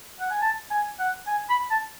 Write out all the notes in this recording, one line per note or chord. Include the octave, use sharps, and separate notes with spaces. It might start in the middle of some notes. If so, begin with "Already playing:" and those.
F#5
G#5
A5
G#5
F#5
G#5
B5
A5